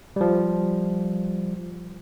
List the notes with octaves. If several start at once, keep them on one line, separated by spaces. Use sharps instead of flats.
F3 G3